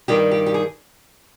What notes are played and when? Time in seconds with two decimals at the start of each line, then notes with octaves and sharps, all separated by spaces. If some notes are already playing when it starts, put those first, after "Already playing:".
0.08 G2 D#3 G3 G4
0.31 G4
0.46 G4
0.54 G#4